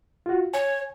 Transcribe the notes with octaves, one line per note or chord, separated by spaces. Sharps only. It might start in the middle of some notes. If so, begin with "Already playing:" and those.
F4 F#4
C#5 G#5